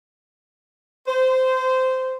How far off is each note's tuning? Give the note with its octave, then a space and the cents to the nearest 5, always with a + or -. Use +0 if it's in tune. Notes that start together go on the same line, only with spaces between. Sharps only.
C5 -15